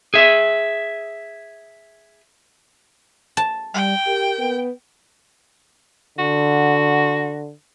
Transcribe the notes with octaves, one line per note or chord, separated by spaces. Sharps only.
G#4 E5
A5
G3 G5
G4 A#4
B3
D3 F#4